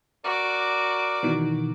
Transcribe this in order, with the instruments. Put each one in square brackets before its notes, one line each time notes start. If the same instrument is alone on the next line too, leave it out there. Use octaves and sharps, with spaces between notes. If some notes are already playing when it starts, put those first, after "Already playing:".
[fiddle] F#4 D6 [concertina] A#4 D5
[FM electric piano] B2 D#3 E3